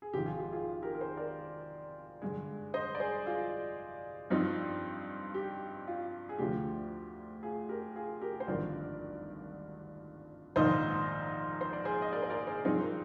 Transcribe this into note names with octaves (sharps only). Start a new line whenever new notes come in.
G#4
G#1 G#2 F3 G4
F4 G#4
G4
F4 G#4
G4 A#4
A#4
G#4 C5
A#4 D5
G2 D3 G#3
C5 D#5
D5
G#4 C5
F4 G#4
G2 F3 C4 D#4
G4
F4
G#4
D2 D3 F3 G4
F4 G#4
G4 A#4
F4 G#4
G4 A#4
C5
G#1 G2 D3 F3 A#4 D5
A#1 G#2 D#3 A#3 D#4 C5 D#5
C5
D5
G#4 C5
D#5
A#4 D5
C5
A#4 D5
G#4 C5
G2 F3 C4 D#4 G#4 C5
A#4